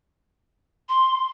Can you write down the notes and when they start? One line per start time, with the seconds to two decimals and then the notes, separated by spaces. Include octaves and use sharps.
0.89 C6